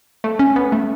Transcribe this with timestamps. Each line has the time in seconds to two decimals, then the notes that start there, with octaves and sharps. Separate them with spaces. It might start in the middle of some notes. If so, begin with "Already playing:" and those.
0.24 A3
0.39 C#4
0.56 B3
0.72 A3